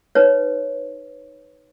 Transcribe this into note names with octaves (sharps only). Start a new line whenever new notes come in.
D#4 B4 C#5